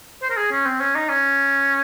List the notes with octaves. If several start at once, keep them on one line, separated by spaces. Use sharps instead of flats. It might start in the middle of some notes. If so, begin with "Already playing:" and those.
C5
A#4
G#4
C#4
C4
C#4
D#4
C#4